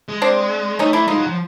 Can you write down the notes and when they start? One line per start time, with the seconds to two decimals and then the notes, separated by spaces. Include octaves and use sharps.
0.09 G#3
0.22 C4 D4
0.79 A3 C#4 D#4
0.93 A3 D4 E4
1.07 G#3 D#4 F4
1.18 F#3
1.27 F3